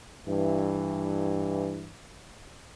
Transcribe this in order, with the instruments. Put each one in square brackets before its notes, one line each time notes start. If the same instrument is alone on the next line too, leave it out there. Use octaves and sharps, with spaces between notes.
[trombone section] G2 E3